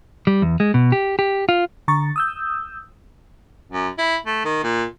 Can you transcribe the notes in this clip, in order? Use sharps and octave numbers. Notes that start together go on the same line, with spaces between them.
G3
E2
G#3
B2
G4
G4
F4
D3 A#5 C#6 A6
D#6 E6 G6
F#2
E4
A3
D#3
A#2